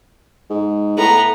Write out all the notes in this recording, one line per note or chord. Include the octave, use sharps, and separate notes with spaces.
G#2
A2 B3 A#5